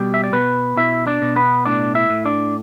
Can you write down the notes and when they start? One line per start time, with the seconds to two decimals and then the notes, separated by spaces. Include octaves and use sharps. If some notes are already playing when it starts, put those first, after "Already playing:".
Already playing: B2 G3 G4
0.14 E5
0.24 D5
0.33 B2 B3 B4
0.77 B2 E4 E5
1.07 D4 D5
1.22 B2
1.36 B3 B4
1.65 A2 D4 D5
1.95 E4 E5
2.10 A2
2.25 D4 D5